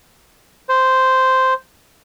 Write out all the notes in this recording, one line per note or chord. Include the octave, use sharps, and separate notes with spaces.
C5